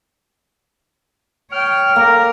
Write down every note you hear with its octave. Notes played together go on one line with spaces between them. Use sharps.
C#5 G5 F6
A#3 A#4